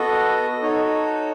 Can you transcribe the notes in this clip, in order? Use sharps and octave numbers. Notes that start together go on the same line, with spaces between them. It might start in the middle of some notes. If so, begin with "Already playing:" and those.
Already playing: B3 F#4 A4 D#5
D#4 F#4 A4 C#5